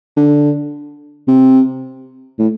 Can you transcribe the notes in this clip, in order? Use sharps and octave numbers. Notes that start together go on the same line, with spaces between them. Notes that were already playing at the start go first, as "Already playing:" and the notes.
D3
C3
A2